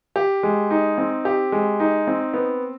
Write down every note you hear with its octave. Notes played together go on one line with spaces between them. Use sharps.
G4
G#3
D#4
C4
G4
G#3
D#4
C4
B3